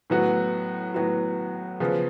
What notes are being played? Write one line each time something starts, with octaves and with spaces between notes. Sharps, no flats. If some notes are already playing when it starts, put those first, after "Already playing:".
A2 F#3 B3 F#4
A2 F#3 B3 F#4
C#3 F3 B3